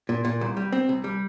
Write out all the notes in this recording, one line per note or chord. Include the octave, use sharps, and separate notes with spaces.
A#2
A#2
C2
G3
C4
C2
G3